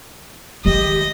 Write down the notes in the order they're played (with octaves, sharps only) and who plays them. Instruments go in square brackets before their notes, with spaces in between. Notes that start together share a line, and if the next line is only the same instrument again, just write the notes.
[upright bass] D#3 G#3 [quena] G4 [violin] D#5